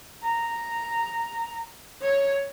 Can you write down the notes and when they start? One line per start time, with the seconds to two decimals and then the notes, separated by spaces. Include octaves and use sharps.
0.22 A#5
2.01 C#5